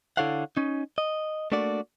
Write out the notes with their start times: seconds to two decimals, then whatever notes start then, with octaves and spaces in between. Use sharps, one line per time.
0.17 D3 E4 A4 C#5 F5 F#5
0.57 C#4 D#4
0.98 D#5
1.52 A3 A#3 D4 F#4 D5